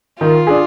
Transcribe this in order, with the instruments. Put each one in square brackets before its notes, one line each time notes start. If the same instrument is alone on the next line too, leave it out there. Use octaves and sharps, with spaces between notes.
[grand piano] D#3 [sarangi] F4
[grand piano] D4 G#4